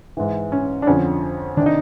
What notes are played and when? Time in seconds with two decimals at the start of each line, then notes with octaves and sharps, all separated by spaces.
0.17 G#2 E3
0.52 C#4
0.82 D4
0.87 F2 D3 F3 C#4
1.57 C3 D#3 D4
1.66 D#4